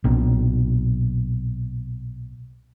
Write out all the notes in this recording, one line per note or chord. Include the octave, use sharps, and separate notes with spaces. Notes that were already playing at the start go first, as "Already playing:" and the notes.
B1 A#2